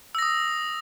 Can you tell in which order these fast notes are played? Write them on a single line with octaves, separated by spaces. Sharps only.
E6 A#6 D#6